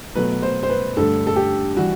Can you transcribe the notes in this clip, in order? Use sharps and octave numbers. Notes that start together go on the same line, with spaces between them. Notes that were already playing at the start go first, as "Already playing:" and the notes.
B2 F#3 A3 B4
C5
C5
B4
G2 D3 A3 A4
A4
G4
E3 G3 F#4